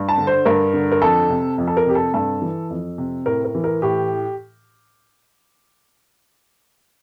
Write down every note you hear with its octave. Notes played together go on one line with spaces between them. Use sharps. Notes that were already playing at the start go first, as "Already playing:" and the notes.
Already playing: G2
A5
D3
C5
G2 A#4
D3
A#4
F2 A4
C3
F2
A4
A#4
C3 G4
A4
G2 A4
E3
F2
C3
A2 A#4
A#4
E3
A#4
A2 G4